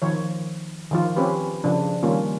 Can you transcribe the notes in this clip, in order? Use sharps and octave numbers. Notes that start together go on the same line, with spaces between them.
D#3 F3 C#5
D#3 F3 F4
C4 C#4 F4 G4 B4
C#3 F3 D4
D#3 G3 A#3 C#4 F4